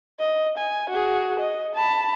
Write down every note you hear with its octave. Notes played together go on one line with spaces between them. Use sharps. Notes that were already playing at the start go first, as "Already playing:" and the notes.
D#5
G#5
F#4 G#4
D#5
A5 B5